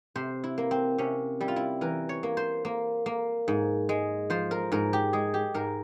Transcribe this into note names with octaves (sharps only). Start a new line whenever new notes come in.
C3 C5
E4
A#3
C4
C3 C#4
G3 E4
F4
E4
E3 A#4
C#5
A#3
C5
A#3
A#3
G#2
G#3
F3 C5
A#4
G#2 A#4
G4
G#3 G#4
G4
G#2 A#4